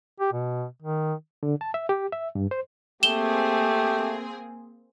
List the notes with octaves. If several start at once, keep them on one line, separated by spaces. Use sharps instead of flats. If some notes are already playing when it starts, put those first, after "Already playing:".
G4
B2
D#3
D3
A5
E5
G4
E5
G2
C5
A3 A#3 C4 G4 G#4 E7 G7